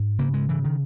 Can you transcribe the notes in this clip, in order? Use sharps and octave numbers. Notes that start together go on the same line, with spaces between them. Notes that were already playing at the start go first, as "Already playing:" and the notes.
Already playing: G#2
C#3 A#3
G#3
C#3 E3
D#3